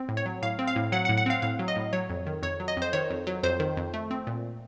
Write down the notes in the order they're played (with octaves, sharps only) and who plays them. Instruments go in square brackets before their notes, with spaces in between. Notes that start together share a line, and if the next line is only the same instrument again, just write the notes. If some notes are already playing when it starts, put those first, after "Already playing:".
Already playing: [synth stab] C4
A2
C#5
F#3
A2 F5
C4
F5
A2
F#3 F#5
F#5
A2
F#5
C4 F5
A2 F5
F#3
D#5
A2
F#3 C#5
F2
D#3
F2 C#5
F#3
D#5
F2 C5
D#3 C#5
F2
F#3
F2 C5
D#3
F2
A3
C4
A#2